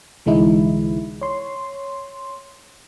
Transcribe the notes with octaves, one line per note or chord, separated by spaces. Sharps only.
C2 D3 E3 G#3 D#4 E4
C#5 C6